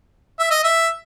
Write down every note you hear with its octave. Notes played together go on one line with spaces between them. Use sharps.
E5
D#5
E5